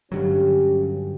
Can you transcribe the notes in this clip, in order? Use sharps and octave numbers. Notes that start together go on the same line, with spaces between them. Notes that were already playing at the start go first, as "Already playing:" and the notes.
G2 D3 F#3 C#4 G4